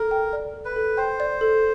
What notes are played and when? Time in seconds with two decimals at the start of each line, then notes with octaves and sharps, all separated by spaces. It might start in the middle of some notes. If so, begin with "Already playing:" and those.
Already playing: A4 A#4
0.11 G5
0.33 D5
0.54 A4
0.65 B4
0.76 A4
0.97 C5 G5
1.20 D5
1.41 A4